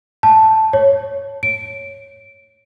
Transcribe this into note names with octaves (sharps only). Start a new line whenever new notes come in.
A5
C#5
D7